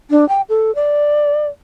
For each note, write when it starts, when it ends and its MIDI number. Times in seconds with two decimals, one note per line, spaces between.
0.10 0.27 62
0.29 0.41 79
0.49 0.74 69
0.75 1.47 74